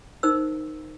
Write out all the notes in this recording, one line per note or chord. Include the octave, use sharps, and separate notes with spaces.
D#4 A#4 C5 E6